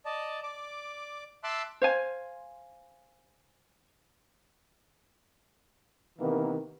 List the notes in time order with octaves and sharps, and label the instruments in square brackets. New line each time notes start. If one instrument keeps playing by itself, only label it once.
[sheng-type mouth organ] D5 D#5 A5
D5 D6
E5 A5 C6 D6 E6 F#6
[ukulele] C5 F5 G#5
[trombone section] C3 D#3 E3 A#3 B3